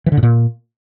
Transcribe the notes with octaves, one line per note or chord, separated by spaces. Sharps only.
E3
D3
A2
A#2